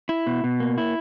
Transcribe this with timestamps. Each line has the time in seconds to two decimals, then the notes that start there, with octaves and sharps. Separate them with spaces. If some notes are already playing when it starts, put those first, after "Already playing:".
0.09 E4
0.27 B2
0.44 B2
0.60 A#3
0.78 E4